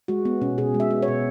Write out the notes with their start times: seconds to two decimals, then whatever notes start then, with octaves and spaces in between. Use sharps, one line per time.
0.08 G#3 F#4
0.25 B3
0.41 B2 C#4
0.58 B2 G#4
0.74 G#3
0.80 E5
0.90 B3
1.03 C#5
1.08 B2